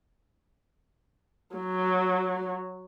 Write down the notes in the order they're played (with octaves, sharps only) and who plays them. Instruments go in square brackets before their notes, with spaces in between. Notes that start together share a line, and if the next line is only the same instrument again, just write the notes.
[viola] F#3